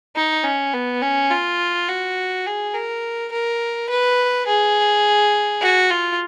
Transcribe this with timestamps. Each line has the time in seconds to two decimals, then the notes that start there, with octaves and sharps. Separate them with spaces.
0.16 D#4
0.44 C#4
0.73 B3
1.01 C#4
1.30 F4
1.88 F#4
2.46 G#4
2.74 A#4
3.31 A#4
3.89 B4
4.47 G#4
5.62 F#4
5.90 F4